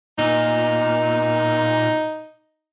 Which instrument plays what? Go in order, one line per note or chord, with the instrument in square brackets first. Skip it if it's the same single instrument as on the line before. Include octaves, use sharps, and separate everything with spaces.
[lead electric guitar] A#2 [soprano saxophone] D#4